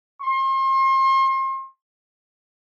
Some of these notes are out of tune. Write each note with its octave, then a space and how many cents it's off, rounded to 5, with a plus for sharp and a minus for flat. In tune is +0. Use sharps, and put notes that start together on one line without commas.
C6 +40